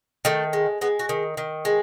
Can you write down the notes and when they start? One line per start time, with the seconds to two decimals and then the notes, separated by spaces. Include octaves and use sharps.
0.25 D#3 A3
0.53 G#3
0.81 G#3 B3
0.99 F#4
1.09 D#3
1.37 D#3
1.65 G#3